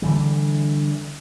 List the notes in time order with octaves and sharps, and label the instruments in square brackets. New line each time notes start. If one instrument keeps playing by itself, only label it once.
[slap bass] D3 E3 G3